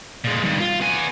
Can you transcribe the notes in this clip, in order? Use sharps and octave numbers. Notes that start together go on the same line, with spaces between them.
A#2 G#3
G2 D#3
F4
B3 G#5